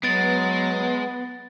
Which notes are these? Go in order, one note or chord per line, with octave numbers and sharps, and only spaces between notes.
F#3 G#3 B3 A6 D7